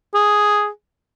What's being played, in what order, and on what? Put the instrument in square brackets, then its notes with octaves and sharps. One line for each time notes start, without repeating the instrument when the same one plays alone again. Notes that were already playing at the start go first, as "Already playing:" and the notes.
[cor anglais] G#4